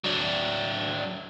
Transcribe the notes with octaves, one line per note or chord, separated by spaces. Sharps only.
F#3 D4